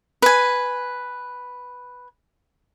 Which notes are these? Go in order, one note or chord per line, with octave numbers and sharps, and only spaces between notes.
B4 G#5